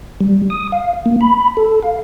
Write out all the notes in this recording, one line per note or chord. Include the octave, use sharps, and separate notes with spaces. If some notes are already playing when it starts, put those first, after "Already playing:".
G3
D#6
F5
A#3
B5
A4
F5